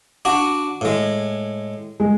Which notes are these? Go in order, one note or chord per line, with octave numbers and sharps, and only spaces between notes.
D4 F#4
A2 G#3
G#3